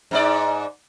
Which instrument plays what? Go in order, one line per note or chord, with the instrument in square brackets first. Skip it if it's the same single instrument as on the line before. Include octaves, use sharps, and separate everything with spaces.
[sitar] G#2 D#4 D5